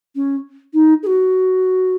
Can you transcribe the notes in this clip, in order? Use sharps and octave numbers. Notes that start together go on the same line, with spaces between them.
C#4
D#4
G#4
F#4